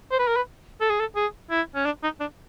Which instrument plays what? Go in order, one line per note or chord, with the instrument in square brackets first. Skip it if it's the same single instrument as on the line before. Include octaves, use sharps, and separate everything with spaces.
[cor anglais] C5
B4
A#4
B4
A4
G#4
A4
G#4
E4
C#4
D4
D#4
D4